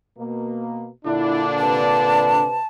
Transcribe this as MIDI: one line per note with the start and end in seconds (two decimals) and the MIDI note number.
0.18 0.88 47
0.18 0.88 58
1.06 2.46 46
1.06 2.46 50
1.06 2.46 62
1.06 1.44 64
1.58 2.57 48
1.58 2.57 71
1.58 2.67 81